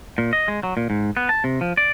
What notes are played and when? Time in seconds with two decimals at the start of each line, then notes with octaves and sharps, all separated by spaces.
0.18 A#2
0.33 D#5
0.48 G#3
0.63 F#3
0.77 A#2
0.90 G#2
1.17 B3
1.29 A5
1.44 C3
1.61 F3
1.77 D5